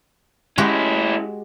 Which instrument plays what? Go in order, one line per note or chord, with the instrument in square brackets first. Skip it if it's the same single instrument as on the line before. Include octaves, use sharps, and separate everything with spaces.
[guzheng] G#3 F#4 G4 [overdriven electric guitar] C#4 E4